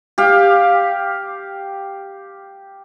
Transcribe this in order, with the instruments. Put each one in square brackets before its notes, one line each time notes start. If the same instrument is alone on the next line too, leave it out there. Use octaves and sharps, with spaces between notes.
[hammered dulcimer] G4 F5